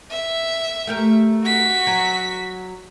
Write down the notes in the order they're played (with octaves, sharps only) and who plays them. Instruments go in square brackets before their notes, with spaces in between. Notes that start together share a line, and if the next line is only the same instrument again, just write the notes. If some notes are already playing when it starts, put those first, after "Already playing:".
[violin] E5
[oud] A3 G4 A#4
[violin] F#4 B6
[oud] F#3